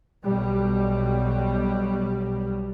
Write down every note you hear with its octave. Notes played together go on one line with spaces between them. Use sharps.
B1 B2 G3